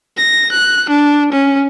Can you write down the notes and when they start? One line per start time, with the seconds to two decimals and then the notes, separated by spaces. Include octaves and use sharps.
0.17 A#6
0.52 F#6
0.89 D4
1.32 C#4